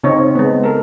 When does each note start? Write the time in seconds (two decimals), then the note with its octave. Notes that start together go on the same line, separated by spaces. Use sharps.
0.04 C#3 C4 D#4 C#5
0.35 G#3 B3
0.64 A4 A#4